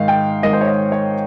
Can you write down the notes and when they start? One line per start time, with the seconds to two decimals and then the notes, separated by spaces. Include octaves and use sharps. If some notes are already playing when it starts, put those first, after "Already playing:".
Already playing: G#2 D#3 F5
0.08 G5
0.43 G#2 D#3 D#5
0.53 C5
0.61 C#5
0.67 D#5
0.92 C#5